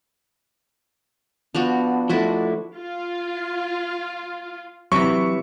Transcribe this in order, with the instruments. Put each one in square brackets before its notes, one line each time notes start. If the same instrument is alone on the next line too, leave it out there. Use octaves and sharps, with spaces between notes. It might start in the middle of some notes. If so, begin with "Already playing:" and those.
[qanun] F3 D4 F#4 [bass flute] B3
[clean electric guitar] F3 A3 [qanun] D4 E4 F#4
[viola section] F4
[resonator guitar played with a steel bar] C3 E3 [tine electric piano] F#3 [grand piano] C#6